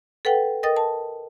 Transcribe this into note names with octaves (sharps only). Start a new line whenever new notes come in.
A4 B4 F#5 G5
A#4 D#5 G5 D#6 A6
A5